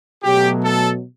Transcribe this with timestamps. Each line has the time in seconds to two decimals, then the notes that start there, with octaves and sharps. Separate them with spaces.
0.23 B2 F#3 A3 G4
0.63 A4